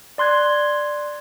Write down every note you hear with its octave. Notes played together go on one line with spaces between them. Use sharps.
D5 C6 F#6 G#6